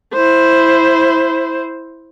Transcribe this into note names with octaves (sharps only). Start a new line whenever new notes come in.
E4 C5